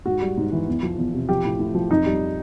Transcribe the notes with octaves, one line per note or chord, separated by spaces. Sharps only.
G#2 F#4
G3
G#2
E3
E2
F3
E2
C3
F3 G4
A2
A2
F3
F2 D#4
G3